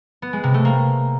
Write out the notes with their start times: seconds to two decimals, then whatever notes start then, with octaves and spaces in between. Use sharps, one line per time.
0.22 B3
0.33 G#3
0.44 C3
0.54 A3
0.65 A#3